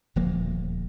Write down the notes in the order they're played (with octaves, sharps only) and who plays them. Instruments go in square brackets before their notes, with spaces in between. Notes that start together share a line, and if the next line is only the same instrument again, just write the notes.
[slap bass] D#1 D2 F3 A#3